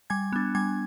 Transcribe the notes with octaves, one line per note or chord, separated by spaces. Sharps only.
G3 G#5 G#6
B3 D4
G3 G#5 G#6